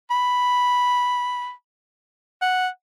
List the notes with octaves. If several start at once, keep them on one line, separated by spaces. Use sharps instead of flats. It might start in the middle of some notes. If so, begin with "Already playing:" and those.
B5
F#5